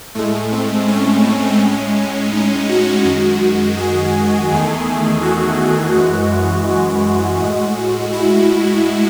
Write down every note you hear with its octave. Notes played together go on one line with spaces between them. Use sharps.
A2 G#3 A3
C4
C#4
A2
G#3
D#4
F#4
F#2 D#3 G#3 F#4
G#4
E2 D#3 A3
F#4
F#2 E3 G#3
F#4
A2 G#3
E4